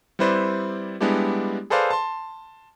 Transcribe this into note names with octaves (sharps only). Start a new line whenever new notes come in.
G3 C4 E4 B4 C5 D5
G3 G#3 B3 D4 E4 G4
G#4 A4 B4 C5 D5 F5
A5 C6